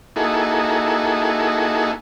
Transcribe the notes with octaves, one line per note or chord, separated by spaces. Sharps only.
A#3 D#4 E4 F#4 G#4 A4